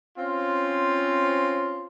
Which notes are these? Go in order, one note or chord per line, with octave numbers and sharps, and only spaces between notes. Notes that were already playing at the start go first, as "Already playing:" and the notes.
C4 C#4 F4